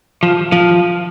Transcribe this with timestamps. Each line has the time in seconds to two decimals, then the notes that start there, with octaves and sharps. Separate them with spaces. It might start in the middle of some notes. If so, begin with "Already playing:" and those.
0.23 F3
0.52 F3